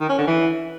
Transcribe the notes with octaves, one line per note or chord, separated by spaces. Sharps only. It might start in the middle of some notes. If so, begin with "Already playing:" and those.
D#3
C#4
D3
E3